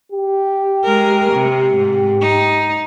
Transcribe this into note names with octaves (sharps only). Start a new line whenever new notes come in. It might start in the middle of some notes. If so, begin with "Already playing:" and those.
G4
G#3 A#4
C3
G#2
D#4